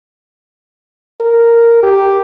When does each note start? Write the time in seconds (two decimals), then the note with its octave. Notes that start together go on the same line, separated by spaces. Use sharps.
1.20 A#4
1.83 G4